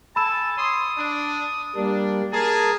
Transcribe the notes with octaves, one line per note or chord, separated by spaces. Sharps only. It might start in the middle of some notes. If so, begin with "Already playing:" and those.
A4 G#5 A5 B5 E6 E7
C#5 C6 D#6
D4
G3 A#3 D4
G#4 A#4 A5